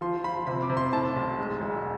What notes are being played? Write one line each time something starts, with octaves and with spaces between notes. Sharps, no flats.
F3 C6
F3 B5
C3 B5
D6
C3
C6
A2 A5
B1
G#3
E1